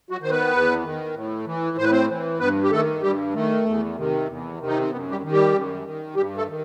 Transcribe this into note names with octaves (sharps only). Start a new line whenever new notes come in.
F#3 F#4
D#3 C5
B3 B4
E2
D#3
A2
E3
A2 C5
B4
C4 C5
E3
G2 B3 B4
G4
D#3 A3 A4
G2 G3 G4
D#3 A3
E2
C3 D#3
E2
C3 D#3
D#4
C4
F#2 B3
G3 G4
D#3
G3 G4
F#2
D#3
G2 G3 G4
A3 A4
D#3